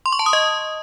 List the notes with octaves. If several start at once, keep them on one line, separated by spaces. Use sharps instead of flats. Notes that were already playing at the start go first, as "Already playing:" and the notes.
C6
C#6
A5
D#6
D#5